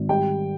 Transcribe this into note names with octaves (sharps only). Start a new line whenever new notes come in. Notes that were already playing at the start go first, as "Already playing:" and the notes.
Already playing: G#1
G3 G5